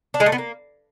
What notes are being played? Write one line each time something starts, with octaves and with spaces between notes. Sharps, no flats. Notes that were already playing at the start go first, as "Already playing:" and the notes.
D4
G#3
A3
B3
A#3